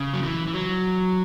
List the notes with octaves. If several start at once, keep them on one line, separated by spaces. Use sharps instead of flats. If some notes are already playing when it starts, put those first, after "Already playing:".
Already playing: C#3
F#3
E3
E3
F#3